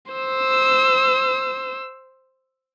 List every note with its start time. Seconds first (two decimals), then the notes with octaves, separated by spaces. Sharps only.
0.12 C5 E6